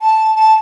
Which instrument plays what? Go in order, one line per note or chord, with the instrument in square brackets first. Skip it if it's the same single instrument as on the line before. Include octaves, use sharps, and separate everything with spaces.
[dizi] A5
A5